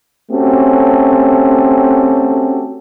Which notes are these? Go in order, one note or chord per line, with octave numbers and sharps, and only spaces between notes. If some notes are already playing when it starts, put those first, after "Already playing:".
A3 C4 C#4 F#4 G4 A4